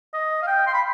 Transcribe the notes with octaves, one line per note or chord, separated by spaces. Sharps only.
D#5
F5
G5
C6
B5